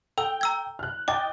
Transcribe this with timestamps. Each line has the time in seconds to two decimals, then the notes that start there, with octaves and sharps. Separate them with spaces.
0.18 A4 G5 E6
0.41 A#5 E6 G#6
0.79 F6 F#6
1.08 D#5 G5 D6 A6